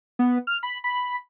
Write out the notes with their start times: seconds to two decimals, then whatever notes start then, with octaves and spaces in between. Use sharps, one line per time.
0.19 B3
0.47 F6
0.63 B5
0.84 B5